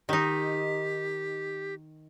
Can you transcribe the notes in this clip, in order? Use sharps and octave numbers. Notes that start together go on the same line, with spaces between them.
D#3 D#4 G4